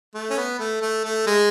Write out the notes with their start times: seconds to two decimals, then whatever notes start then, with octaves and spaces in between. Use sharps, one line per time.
0.14 A3
0.30 C#4
0.37 B3
0.59 A3
0.82 A3
1.04 A3
1.27 G#3